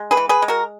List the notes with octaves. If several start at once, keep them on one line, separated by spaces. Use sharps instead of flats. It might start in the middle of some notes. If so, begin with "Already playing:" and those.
Already playing: G#3
G#4 B4
E3
G#4 B4
G#3
F#4 A#4